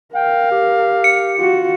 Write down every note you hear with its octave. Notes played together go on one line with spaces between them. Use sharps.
A#4 F5 G5
G4
C#7
F4 F#4